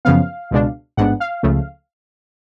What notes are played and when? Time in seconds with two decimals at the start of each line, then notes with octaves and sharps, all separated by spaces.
0.05 F#2 C#3 F3 B3 F5
0.51 C#2 B2 G#3 D4
0.97 A1 G#2 G#3 B3 D4 F#5
1.20 F5
1.43 C#2 C#3 F3 A3